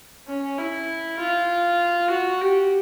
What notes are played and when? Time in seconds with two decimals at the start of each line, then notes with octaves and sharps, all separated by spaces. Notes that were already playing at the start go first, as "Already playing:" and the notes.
0.28 C#4
0.58 E4
1.19 F4
2.10 F#4
2.41 G4